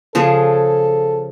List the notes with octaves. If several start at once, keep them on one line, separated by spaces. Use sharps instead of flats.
C#3 F3 G#4 A4